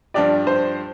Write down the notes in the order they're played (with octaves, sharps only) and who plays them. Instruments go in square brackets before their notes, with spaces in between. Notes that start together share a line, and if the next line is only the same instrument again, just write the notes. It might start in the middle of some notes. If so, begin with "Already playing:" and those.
[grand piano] G2 F3 D4 G4 [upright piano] D5
[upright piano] C5